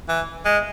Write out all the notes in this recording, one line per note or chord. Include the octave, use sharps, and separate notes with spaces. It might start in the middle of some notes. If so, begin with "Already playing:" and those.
E3
G#3